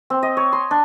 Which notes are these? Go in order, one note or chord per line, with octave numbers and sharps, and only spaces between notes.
C4
D#5
C#5
C6
D4